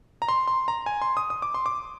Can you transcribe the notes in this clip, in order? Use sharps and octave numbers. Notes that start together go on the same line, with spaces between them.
A#5
C6
C6
A#5
G#5
C6
D#6
D#6
D6
C6
D6